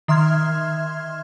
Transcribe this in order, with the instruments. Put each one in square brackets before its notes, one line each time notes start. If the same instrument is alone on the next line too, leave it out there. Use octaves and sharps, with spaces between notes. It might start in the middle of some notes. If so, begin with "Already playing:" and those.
[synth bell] D#3 E5 C6 F6 G#6